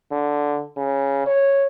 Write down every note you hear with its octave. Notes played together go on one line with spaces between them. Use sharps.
D3
C#3
C#5